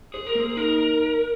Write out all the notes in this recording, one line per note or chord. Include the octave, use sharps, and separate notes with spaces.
G#4 C5
A#4
A#3 G#4
D#4 A#4